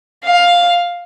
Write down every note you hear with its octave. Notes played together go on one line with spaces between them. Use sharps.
F5